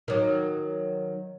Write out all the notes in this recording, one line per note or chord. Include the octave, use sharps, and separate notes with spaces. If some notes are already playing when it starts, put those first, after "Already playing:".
D#3 F#3